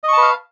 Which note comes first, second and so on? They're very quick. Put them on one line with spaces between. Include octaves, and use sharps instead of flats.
D#5 C#6 A5 B4 F5